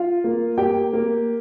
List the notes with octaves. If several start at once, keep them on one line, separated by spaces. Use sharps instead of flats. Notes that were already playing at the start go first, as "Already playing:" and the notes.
Already playing: F4 F5
A#3
A#3 G4 G5
A#3